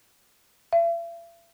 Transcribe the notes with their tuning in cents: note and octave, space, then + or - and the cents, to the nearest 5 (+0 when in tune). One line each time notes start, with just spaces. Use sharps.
E5 +45